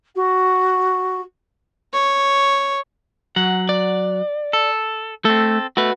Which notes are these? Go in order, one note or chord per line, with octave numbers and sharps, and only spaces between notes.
F#4
C#5
F#3 F#5
D5
A4
A3 C4 A4
A3 F#4 B4